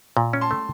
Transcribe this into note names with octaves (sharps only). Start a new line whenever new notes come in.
A#2
C#4
A5 C6
A3